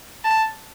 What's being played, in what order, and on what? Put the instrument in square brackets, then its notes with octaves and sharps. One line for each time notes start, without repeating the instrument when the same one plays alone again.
[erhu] A5